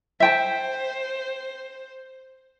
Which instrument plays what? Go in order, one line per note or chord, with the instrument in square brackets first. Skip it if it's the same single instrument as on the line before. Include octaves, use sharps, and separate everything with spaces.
[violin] C5 [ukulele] E5 G5 A5